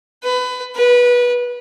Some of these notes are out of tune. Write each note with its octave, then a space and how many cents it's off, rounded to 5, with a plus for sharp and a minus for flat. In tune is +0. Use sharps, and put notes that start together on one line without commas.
B4 +20
B4 -20